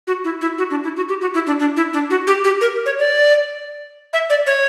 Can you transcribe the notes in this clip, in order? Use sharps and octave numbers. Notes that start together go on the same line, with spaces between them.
F#4
E4
E4
F#4
D4
E4
F#4
G4
F#4
E4
D4
D4
E4
D4
F#4
G4
G4
A#4
C#5
D5
E5
D5
C#5